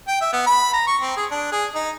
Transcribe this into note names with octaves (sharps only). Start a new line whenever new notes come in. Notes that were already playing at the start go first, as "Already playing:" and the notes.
G5
E5
B3
B5
A#5
C#6
C4
G#4
D4
G#4
D#4